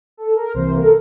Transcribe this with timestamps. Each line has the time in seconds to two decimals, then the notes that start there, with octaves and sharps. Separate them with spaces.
0.17 A4
0.36 A#4
0.54 C2 C3 E3 A#3 C5
0.73 A#4
0.82 A4